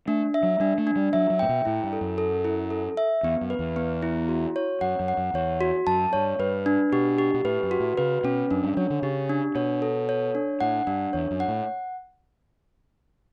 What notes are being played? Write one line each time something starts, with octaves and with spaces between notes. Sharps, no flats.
A3 D4
E5
F#3
G3 D4
A3
D4
G3
F#3 E5
F#3
A2 G5
B2
A2 E4
G2
A4
F#2
A4
E4
A4
E5
E2 B3
F#2
B4
E2
B3
E4
F#4
C#5
F#2 F#5
F#2
F#5
F#2
E2 C#5
F#4
F#2 A5
G2 C#5
G2 B4
D4
B2 G4
G4
B2
A2 B4
F#2
F#4
A2
C#3 B4
B2 C#4
F#2 D4
G2
F#3 C#5
D3
C#3 G4
D4
B2 C#5
A4
C#5
D4
A2 F#5
G2 D4
E2 C#5
F#2
F#5
A2